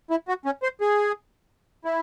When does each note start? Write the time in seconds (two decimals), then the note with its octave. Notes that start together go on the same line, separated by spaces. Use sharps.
0.10 E4
0.28 F#4
0.45 C#4
0.63 C5
0.81 G#4
1.85 E4